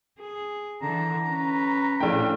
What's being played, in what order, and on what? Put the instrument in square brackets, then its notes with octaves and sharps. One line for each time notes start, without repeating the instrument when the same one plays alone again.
[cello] G#4
[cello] D3 E3 [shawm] A#5
[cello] C#4 B4
[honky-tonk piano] A#1 G5 [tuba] A2